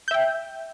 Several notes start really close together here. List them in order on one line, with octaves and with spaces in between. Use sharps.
G6 E5 G5